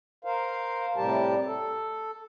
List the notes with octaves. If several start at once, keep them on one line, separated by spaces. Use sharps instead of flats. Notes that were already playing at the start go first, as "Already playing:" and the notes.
A#4 C5 F5
A2 C3 G3 G4 A#4 A5
A4